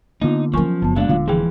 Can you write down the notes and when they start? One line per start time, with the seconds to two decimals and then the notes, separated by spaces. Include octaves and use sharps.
0.21 D3 A#3 B3 D#4 F4
0.54 F3 F#3 C#4 A#4 G#5 C#6
0.82 F#1 B3 A5
0.96 F#3 G#3 A#3 D4 F5
1.09 D#1 D3 F4 F5
1.28 E3 F3 G#4 G5